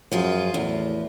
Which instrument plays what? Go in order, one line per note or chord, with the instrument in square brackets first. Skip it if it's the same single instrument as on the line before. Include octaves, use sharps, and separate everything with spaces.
[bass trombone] F#2 [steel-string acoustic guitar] F3 F4 G#4
[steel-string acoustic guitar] E2 [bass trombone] A2